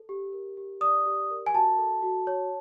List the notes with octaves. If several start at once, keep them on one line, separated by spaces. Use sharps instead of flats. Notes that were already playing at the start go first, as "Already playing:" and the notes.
Already playing: A4
G4
A#4
G4
D5 D#6
G4
A#4
G#5
F#4 A5
A4
F#4
C#5